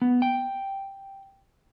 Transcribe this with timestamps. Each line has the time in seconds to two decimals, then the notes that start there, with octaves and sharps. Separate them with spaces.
0.02 B3
0.22 G5